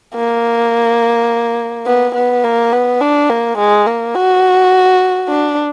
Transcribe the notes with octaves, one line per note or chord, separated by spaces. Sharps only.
A#3
B3
B3
A#3
B3
D4
A#3
G#3
A#3
F#4
D4